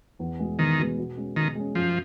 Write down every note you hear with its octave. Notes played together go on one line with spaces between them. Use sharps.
E2
B2 G#3 B3
E2 D#3
B2 G#3 B3
B2
G#3 C#4
B2 D#3
G#3 C#4
F#2 F3